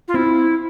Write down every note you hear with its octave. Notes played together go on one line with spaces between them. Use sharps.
F4
C4 E4